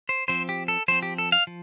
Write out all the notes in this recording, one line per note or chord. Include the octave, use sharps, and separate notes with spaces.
C5
F3 C4 C5
G4
A4
F3 C4 C5
G4
A4
F5
F3